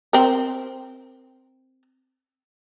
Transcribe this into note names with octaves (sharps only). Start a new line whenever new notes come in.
C4 A#4